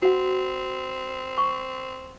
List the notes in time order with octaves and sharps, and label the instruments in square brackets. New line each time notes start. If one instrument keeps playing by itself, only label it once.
[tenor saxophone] C4 [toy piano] F#4 F#5
[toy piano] C#6